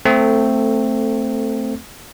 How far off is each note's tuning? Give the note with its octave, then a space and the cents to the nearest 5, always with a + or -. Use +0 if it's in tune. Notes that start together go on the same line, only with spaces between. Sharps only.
A3 +10 C4 -5 A4 +20